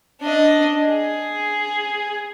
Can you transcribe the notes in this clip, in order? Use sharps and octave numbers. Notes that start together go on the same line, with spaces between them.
D4 D#5
G#4